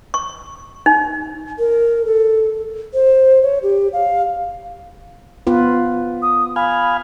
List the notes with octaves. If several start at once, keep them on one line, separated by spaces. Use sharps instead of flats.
C#6
D#4
A#4
A4
C5
C#5
G4
F5
B3 F4 B4
D#6
F5 G#5 B5